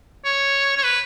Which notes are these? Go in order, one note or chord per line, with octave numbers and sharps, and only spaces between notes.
C#5
C#5
B4